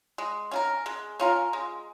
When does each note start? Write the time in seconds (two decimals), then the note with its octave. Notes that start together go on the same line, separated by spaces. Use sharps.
0.18 G#3
0.51 C#4 F4 A#4
0.86 G#3
1.20 C#4 F4 A#4
1.53 G#3